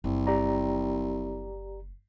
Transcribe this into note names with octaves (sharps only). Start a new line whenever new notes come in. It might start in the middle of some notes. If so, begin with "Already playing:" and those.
F#1 C2
G4 D5 A#5